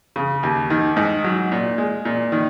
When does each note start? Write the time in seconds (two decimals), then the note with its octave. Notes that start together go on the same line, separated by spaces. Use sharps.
0.16 C#3
0.43 D#2
0.70 D#3
0.97 G#2
1.24 F#3
1.52 A#2
1.78 G#3
2.05 A#2
2.32 D#3